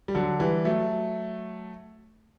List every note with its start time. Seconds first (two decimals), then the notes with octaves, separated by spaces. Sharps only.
0.08 G3
0.15 D3 F#3
0.39 E3 G3
0.65 F#3 A3